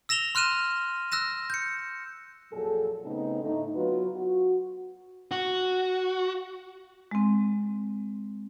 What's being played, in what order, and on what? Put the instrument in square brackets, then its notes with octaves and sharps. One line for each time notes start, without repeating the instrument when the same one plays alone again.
[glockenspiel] E6 A#6 E7 F7 G7
C6 F6 F#6 D#7 E7
E6 F#6 A#6 E7
G6 C#7
[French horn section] F2 A#2 F#3 G#4 A4
C#3 A3 B3 C4 D#4
A2 D3 A3 D#4
F#3 B3 F4 F#4 B4
F#4
[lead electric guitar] F#4
[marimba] G#3 C4